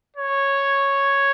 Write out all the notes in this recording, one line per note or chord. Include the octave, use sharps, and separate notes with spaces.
C#5